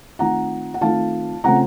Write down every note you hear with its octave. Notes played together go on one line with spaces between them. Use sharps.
D#3 A3 C4 F4 F#5 A#5
F#5
D#3 A3 C4 F4 F5 A5
C#3 A3 C4 F4 F#5 A#5